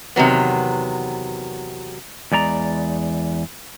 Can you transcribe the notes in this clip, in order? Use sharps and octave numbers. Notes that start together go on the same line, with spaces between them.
E2 C3 D#3 F#3 B3
E2 G#3 D5 A#5